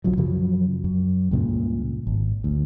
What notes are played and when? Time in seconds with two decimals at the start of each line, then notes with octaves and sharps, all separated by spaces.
0.04 C2 C#3 F3 F#3
0.17 F#2 C#3 F3 F#3
0.84 F#2
1.31 C#2 G2 A#2 C#3
2.07 G#1
2.44 D2